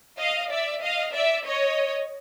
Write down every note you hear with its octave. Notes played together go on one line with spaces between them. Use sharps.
D#5 F5
D5 E5
D#5 F5
D5 E5
C#5 D#5